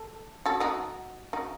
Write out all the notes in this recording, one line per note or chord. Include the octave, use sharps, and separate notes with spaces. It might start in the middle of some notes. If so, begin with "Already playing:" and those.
Already playing: A4
F#4 A4
D#4 F#4
D#4 F#4